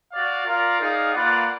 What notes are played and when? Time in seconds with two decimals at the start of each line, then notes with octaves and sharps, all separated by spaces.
0.12 F#4 D5 F5
0.46 F4 A#4 D5 F5
0.80 D#4 G#4 D5 F5
1.13 A#3 F4 B4 D5 F#5